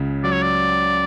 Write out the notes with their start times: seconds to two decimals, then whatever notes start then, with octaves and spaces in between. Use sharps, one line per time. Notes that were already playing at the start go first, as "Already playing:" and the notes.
Already playing: C#2 C#3
0.24 F#3 D5
0.33 C#5
0.42 D5